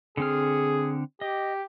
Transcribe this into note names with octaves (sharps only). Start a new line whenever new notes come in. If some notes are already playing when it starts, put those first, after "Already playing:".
D3 C4 G#4 F6
G4 D#5